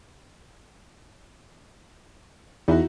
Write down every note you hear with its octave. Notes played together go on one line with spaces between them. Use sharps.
E2 D#4 E4 F#4